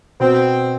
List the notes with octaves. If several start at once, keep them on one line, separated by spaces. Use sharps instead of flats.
B2 C4